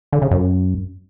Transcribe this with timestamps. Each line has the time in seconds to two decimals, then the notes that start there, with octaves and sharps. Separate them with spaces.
0.13 D3
0.22 C#3
0.31 F#2